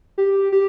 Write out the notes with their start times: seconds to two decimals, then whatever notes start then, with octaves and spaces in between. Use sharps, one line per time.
0.18 G4
0.52 G4